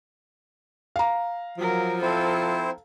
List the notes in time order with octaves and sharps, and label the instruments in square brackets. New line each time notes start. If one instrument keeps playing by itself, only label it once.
[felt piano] F5 A#5
[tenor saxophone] F3 [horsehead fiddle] F#3 A#4
[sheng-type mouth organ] C4 E4 C5 [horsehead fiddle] A4